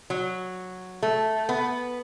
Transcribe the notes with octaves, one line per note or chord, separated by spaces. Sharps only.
F#3
A3
B3